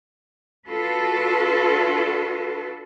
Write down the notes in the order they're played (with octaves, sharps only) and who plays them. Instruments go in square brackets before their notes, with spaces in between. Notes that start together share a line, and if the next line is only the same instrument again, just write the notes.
[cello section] D4 F4 F#4 A4 B4